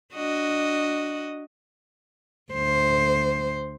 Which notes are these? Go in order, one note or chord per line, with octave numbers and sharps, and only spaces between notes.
D4 F#4 D#5
D2 C5